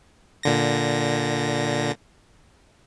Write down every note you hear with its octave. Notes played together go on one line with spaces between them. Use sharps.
A#2 D3 A#6